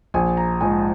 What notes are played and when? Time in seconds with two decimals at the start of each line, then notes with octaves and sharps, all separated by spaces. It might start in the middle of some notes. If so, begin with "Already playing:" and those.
0.14 A#1 G#5
0.37 A#5
0.61 G#2 F3 G#5